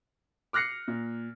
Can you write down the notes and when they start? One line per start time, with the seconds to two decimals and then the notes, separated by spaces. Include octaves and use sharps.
0.53 D6 F6 F#6 A#6 C7 C#7
0.88 A#2